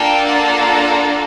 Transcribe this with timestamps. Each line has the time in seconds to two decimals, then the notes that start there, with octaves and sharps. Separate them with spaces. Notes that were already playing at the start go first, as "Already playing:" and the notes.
Already playing: A#3 D4 F4 A4 G5
0.27 F#5